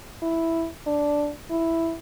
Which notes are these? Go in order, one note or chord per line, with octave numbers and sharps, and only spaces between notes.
E4
D4
E4